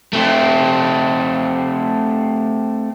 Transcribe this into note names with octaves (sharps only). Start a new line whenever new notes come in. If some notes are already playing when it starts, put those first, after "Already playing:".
A3 C4